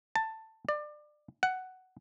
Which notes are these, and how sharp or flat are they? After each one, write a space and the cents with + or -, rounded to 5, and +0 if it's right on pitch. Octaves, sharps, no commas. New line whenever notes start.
A5 +10
D5 +25
F#5 +10